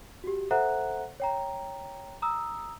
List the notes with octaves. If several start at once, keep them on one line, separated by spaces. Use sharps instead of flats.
F#4 G4
A4 C5 E5 F#5 A#5 F#6
C#5 G5 A#5
A#5 D#6 E6